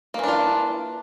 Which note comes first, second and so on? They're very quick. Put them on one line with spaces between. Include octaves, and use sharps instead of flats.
A#3 E3 D4 F4